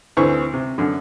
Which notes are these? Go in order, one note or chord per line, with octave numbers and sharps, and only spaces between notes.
D2 E3 C4 C#6
C3
F#2 D3